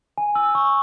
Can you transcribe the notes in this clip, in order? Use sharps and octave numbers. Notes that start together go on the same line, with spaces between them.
G#5
E6
C#6